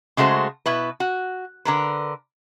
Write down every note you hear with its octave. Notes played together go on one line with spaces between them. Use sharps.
C#3 G#3 A3 F#4 C5
B2 E4 B4
F#4
D3 A#4 B4